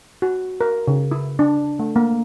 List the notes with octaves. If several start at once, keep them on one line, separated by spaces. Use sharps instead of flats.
F#4
A#4
C#3
E4
D4
A3
A#3